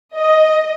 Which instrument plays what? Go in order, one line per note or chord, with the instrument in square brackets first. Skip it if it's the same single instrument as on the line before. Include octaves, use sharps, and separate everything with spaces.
[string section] D#5